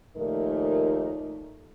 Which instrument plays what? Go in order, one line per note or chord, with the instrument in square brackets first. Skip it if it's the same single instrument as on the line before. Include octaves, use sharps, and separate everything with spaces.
[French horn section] D#2 A#2 F3 A3 D#4 A#4